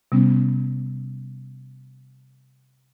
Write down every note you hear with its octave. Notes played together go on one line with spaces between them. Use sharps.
C3 G3 B3 C#4